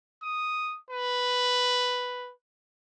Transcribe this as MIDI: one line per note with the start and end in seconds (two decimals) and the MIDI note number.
0.23 0.77 87
0.91 2.32 71